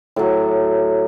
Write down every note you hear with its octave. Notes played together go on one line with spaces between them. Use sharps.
A2 F#3